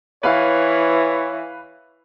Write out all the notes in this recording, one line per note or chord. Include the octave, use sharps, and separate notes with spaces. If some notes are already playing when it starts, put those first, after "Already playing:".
E3 B4 C#5 F5